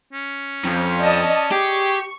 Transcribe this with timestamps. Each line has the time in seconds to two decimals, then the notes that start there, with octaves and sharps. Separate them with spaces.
0.13 C#4
0.64 F2
0.99 D5 D#5 A5
1.51 G4 G#4 C#6